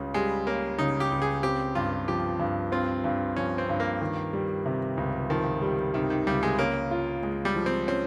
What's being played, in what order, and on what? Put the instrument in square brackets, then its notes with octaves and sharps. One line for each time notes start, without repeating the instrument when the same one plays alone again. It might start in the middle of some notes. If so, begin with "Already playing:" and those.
Already playing: [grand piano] C#2 C#3 G3 C#4
[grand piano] G3 [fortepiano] G#3
[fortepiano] A#3 [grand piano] C#4
[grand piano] C#3 [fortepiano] D#4
[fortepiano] G4
[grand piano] C#2
[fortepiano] G#4
[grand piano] C4 [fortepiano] G4
[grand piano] G2 [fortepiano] F4
[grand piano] F3 [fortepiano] G4
[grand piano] G2
[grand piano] C4 [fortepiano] F4
[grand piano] G2
[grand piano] F3 [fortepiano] C#4
[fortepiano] C4
[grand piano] G2
[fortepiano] A#3
[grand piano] D#3
G3
C3
C#2
[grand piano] D#3 [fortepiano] F3
[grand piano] G3
[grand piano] C3 [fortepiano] D#3
[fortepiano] D#3
[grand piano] C#2 [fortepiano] G3
[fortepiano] G#3
[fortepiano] A#3 [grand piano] C#4
[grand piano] F4
G#3
[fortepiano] G3
[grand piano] F3
[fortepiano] C4
[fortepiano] C4 [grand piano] C#4